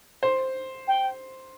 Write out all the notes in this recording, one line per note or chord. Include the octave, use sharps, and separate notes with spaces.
C5
G5